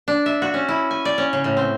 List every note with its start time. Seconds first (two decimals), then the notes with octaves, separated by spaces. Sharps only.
0.08 D4
0.26 E5
0.42 F#4
0.54 C#4
0.69 E4
0.91 G#5
1.05 D5
1.18 C#4
1.33 C#3
1.44 A2
1.57 C4